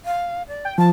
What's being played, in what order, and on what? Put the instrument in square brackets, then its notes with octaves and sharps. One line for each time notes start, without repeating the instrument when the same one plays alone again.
[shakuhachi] F5
D5
[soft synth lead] G5
[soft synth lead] F3 [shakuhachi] A5